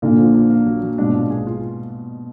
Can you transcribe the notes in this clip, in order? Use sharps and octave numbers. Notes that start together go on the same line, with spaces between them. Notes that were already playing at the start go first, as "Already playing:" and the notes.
A#2 D3 A#3
F3
A#3
A#3
F#3
F#3
G#2 B2 D4
A#2
G#4
F4